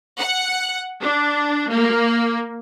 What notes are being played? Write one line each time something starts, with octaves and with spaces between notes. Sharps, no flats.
F#5
D4
A#3